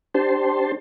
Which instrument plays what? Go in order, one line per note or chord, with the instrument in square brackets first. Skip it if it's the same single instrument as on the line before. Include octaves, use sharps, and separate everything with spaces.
[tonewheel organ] D4 G4 C5 A5 C6